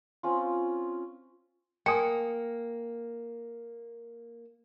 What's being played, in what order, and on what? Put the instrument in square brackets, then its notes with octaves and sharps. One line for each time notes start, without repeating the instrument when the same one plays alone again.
[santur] C4 C#4 F4
[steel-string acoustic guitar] A#3 [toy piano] G5 G#5 D#6